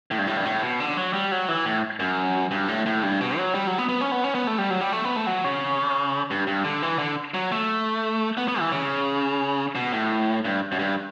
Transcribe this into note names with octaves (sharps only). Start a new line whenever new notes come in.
A2
G2
A2
G2
A2
B2
D3
F#3
G3
F#3
E3
A2
F#2
G2
A2
A2
G2
B2
F#3
G3
F#3
B3
B3
C#4
B3
C#4
B3
A3
G3
F#3
G3
A3
B3
A3
F#3
C#3
G2
G2
D3
E3
D3
F#3
A3
B3
B3
E3
C#3
B2
A2
G2
F#2
G2